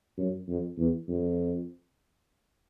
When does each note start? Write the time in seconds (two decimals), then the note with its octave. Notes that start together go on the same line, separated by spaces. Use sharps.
0.18 F#2
0.48 F2
0.78 E2
1.08 F2